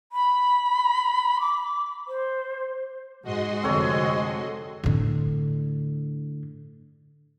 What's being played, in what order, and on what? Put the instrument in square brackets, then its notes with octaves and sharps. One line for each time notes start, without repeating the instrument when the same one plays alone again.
[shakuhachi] B5
D6
C5
[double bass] G#2 [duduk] G#3 [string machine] F#4 D#5 C6
[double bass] F1 D3 [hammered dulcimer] C4 A4 C#5
[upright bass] A2 D3